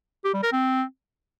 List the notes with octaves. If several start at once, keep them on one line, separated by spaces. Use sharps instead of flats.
G4
G3
A#4
C4